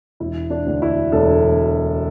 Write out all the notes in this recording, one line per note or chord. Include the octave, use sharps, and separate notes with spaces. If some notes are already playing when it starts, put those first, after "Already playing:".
E1 E4
D4
D2 D3
E4
E1 A4